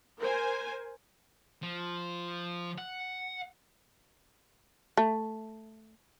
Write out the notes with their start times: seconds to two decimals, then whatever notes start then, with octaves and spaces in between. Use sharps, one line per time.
0.18 A#4 C5 G#5
1.63 F3
2.78 F#5
4.97 A3